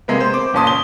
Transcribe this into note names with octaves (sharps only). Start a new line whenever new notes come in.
C3 G#3 A#3 B3
C5
D6
F#1 A#2 C#4 A5 C6 D#6
G7